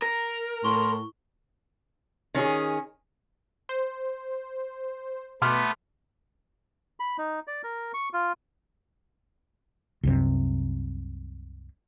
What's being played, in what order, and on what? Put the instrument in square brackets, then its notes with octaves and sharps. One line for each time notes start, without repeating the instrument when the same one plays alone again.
[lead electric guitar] A#4 [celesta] A#6
[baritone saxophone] A2 [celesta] E4 C#6 G7 [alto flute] C6
[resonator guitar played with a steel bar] D#3 C#4 D#4 G#4
[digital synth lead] C5
[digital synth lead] B2 [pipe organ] A3 B3 B4 [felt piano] C6 D6 F6
[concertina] B5
D#4
D5
A#4
C#6
F4
[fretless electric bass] C2 F#2 C3